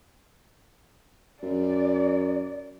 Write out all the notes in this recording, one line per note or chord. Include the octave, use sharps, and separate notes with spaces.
F#2 D5